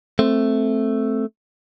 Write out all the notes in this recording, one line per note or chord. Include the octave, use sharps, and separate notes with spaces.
A3 C4